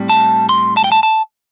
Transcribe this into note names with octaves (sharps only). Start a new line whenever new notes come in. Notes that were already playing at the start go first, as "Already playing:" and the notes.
Already playing: A2 G3 C4
A5
C6
A5
G5
A5
A5